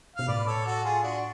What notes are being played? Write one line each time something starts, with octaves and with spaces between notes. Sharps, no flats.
B2 F5
A2 B4 D5
A4 C#5
F#4 A4
F4 G#4
D4 F#4